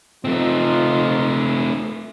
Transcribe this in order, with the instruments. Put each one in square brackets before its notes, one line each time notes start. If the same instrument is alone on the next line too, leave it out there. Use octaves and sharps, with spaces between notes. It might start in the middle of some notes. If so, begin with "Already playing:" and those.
[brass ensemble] F3 D#4 F4 [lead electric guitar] A3 C4